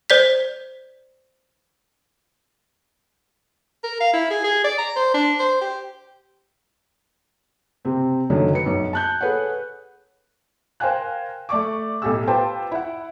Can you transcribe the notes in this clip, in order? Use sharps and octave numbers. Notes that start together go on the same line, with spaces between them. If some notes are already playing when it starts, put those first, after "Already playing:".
C5 D5 G6 B6
A#4
F5
E4
G#4
G#4
D5
A#5
C5
D4
C5
G4
C3 C4
F#2 D3 D#3 F#3
B4 C#7
B1 F#2
A5 F#6 G6
G#4 A4 B4 C#5 F#5
A#4 C5 F5 G5 G#5 F#6
A3 D5 C#6 D6
B1 A2 G4 A4 G#5 E6
F4 G4 B4 C5 G5 A5
E4 F#5